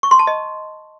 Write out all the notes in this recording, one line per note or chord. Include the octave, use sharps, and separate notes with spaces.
C#6
C6
A5
D#5